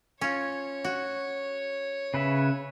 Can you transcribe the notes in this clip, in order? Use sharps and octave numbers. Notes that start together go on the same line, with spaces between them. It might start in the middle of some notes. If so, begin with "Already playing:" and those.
C#4 F4 C#5
F#4
C#3 B4 E5